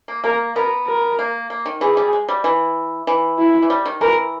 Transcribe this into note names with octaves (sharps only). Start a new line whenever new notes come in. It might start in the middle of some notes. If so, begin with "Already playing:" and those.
A#3
A#3 A#4
B3 A#4
A#4
A#3
A#3
D#3
E3 G#4
G3
G#3
G3
E3
E3
E4
E3
G3
D#3
E3 A#4